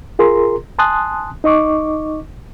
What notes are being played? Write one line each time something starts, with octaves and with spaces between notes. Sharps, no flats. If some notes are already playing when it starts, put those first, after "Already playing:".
F4 G#4 A#4 A#5 C6
G#5 A5 C6 D#6 F#6
D#4 D#5 C#6 D6